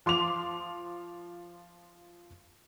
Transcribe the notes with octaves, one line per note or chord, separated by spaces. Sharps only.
F3 C6 D6 F7